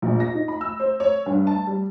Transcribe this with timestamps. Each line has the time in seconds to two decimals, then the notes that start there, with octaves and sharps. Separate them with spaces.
0.02 A#1
0.20 A#6
0.35 D#4
0.48 B5
0.61 E6
0.80 C5
1.00 C#5
1.26 G2
1.47 A5
1.67 G3